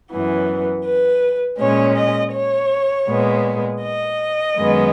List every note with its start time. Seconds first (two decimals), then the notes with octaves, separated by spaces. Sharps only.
0.10 F#2 E3 B3
0.85 B4
1.59 A#2 G#3 C#4 C#5
1.97 D#5
2.34 C#5
3.08 A#2 G#3 B3
3.82 D#5
4.57 F#2 D#3 G#3 B3